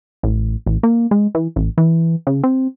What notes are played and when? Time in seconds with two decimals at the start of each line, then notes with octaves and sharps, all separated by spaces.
0.23 A1
0.66 A1
0.83 A#3
1.11 G#3
1.35 E3
1.56 A1
1.78 E3
2.27 C#3
2.43 C4